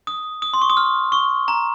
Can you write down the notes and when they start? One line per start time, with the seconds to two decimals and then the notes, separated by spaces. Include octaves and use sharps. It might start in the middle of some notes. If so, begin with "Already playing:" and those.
0.07 D#6
0.42 D#6
0.54 C6
0.62 C#6
0.70 D#6
0.77 F6
1.12 C#6
1.48 A#5